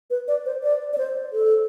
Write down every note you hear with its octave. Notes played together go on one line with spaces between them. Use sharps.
B4
D5
C5
D5
D5
C5
A4